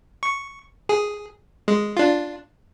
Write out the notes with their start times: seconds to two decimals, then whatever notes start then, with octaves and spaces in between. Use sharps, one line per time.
0.23 C#6
0.89 G#4
1.68 G#3
1.97 D4 F4